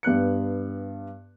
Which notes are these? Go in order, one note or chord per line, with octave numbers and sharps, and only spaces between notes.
G2 B3 F#6 C#7